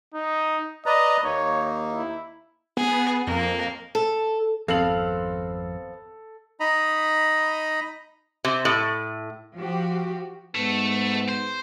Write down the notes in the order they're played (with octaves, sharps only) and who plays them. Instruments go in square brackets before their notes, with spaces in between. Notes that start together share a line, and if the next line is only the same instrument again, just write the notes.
[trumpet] D#4
[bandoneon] B4 D5 A#5 [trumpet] D#5
[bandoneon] D#2 A#3 D#4 [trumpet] C#5
[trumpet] E4
[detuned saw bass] B3 [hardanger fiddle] G#4
[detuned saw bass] F2 [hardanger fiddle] A#3
[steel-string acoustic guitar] A4
[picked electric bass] G#1 [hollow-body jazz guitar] F2 [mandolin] B3 C4 F5 [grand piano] A4 F#7
[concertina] D#4 D#5 A#5 B5
[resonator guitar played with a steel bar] C3
A2
[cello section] F3 F#4 G4
[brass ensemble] G#2 B3 [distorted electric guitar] A3
[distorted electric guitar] C5